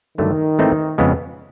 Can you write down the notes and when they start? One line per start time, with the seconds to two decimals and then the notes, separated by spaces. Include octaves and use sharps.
0.18 G2 D3 D#3 F#3 A3
0.59 G#2 E3 A3 C4 D#4
0.98 F2 C#3 F3 G#3 B3